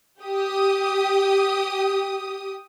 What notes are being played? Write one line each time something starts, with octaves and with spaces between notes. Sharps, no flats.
G4 D#6